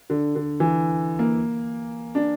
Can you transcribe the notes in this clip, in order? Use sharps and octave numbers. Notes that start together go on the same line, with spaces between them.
D3
D3
E3
A#3
D4